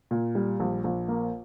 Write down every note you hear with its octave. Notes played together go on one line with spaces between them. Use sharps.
A#2
G3
A#1
A#1
A#3